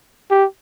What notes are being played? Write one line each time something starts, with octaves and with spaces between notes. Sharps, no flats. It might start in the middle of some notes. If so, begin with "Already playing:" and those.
G4